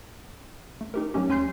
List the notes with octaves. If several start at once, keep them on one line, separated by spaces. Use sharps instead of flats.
A3
D#4 G4 A#4
F#3 G3 A3 C#4 G4
D#2 C#4 G#5 C6 G6 C7